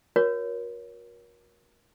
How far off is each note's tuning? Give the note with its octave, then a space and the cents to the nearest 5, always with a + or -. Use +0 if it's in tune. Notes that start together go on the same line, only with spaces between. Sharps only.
F#4 -30 A#4 +30 C#5 +5